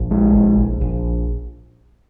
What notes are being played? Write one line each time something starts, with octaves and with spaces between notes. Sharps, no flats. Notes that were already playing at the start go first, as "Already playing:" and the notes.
Already playing: A#1
G#3
A#1
A#1
A#1